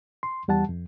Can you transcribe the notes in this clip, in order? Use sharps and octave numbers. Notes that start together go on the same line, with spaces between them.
C6
E2 G3 F#5 A5
F2